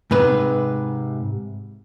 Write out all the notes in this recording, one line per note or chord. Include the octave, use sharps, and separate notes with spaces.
G#2 C3 B4